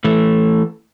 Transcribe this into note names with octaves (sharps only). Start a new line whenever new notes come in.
E3 A3